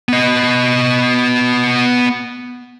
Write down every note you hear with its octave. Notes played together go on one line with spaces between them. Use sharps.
B3 D#5